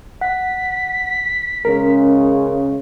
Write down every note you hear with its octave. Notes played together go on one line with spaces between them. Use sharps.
F#5 B6
C#3 G#3 C#4 A#4